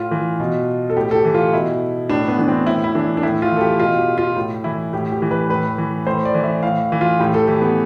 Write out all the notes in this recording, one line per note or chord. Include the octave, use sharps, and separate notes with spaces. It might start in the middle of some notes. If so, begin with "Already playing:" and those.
Already playing: A2 F4
E3
B2
A4
A2 G4
A4
G4
E3
F4
B2 E4
A2 D4
B3
E3 D4
C4
A2 E4
E4
E3 D4
D4
A2 E4
F4
E3 A4
G4
B2 F4
G4
F4
A2
E3 E4
A2 G4
G4
E3
B4
A2 B4
E3
A2 C5
D5
E3
E5
A2 F5
E3
F4
A2 G4
A4
E3 G4
B3